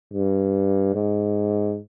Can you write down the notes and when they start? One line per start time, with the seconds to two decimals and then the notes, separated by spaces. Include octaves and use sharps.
0.13 G2
0.95 G#2